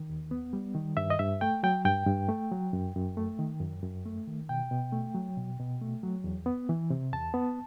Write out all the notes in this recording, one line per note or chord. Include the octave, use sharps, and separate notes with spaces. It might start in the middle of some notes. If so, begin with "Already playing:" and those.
Already playing: D#3
D#2
B3
G3
D#3
G2 E5
D#5
G2 E5
A3 G5
F#3 G5
G2 G5
G2
A3
F#3
F#2
F#2
A3
D#3
F#2
F#2
A3
D#3
B2 G5
B2
A3
F#3
B2
B2
A3
F#3
E2
B3
E3
C3
E2 A5
B3